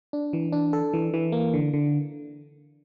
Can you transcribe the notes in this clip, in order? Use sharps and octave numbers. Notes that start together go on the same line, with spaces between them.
D4
E3
D4
A4
E3
E3
A#3
D3
D3